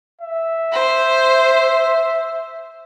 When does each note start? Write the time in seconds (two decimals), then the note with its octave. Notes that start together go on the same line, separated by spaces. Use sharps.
0.21 E5
0.72 C5